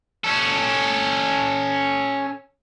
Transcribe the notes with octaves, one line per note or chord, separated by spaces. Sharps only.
C#4 A4